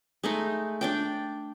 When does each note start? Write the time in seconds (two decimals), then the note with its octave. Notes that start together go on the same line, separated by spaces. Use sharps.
0.23 G#3 A3 D#4
0.81 D4 D5 G5